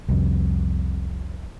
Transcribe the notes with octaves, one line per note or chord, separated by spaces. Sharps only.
C2 F2